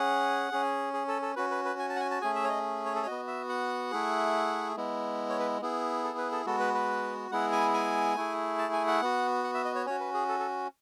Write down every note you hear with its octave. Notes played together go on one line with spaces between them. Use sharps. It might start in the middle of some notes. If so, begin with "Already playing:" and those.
Already playing: C#4 G#4 F#5
C#4 G#4
G#4
A4
A4
C#4 F#4 B4
B4
B4
G#5
A5
F#5
G#5
A5
A3 C#4 G#4 G#5
E5
C#5
D#5
C#5
A4
C#5
B3 F#4 D#5
E5
F#5
A3 E4 G#4
G#3 B3 E4
C#5
B4
B3 E4 G#4
A4
B4
A4
G#3 B3 F#4 A4
B4
B4
G#3 B3 E4 G#4 F#5
G#5
G#5
A3 E4 G#4
A5
G#5
F#5
B3 F#4
F#5
E5
D#5
C#5
C#4 F#4 C#5
B4
G#4
A4
A4